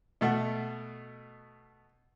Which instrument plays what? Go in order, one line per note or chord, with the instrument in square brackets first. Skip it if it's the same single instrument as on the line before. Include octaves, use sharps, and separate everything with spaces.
[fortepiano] B2 A3 F#5